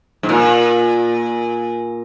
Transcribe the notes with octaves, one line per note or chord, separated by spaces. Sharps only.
G#2
A#2